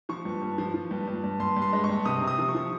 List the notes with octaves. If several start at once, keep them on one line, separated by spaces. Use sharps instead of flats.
F3 C#6
G2
G2
F3
F3
G2
G2
G2
G2 C6
G2
C6
G#3
C#6
G2
C3 D#6
C3
D#6
F3
C#6
F3